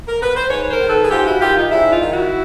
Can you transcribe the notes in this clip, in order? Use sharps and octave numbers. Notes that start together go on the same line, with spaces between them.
A#4
B4
C5
G#2 B4 C#5
C#5
A#4 C5
D#3
A4 B4
G#4
G#2 F4 G4
E4 F#4
D#3 F4 G4
D#4 F4
G#2 D4 E4
D#4 F4
D#3
E4 F#4